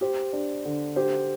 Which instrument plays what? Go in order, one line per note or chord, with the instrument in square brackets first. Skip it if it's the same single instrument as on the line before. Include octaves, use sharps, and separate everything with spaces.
[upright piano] G4 [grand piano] C5
[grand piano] D4
D3
[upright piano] G4 [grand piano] C5